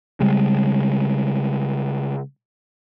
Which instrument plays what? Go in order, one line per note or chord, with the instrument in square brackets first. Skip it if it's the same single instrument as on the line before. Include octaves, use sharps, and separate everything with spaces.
[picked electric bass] C#3 G3 G#3